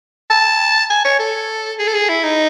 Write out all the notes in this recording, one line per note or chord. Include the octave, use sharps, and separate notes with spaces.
A5
G#5
C#5
A4
G#4
A4
G#4
E4
D#4